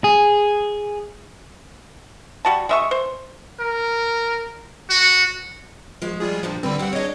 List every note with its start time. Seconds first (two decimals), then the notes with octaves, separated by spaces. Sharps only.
0.04 G#4
2.45 G3 F#4 A5
2.69 G#3 E5 C#6
2.91 C5
3.60 A#4
4.90 F#4
6.02 F3 G#3 F#4
6.20 G3 F4 G#4
6.43 A#2 D3 F3 G3
6.63 D3 G3 C4 B4
6.79 F2 G3 C4 F#5
6.93 G#3 D4 C#5 D#5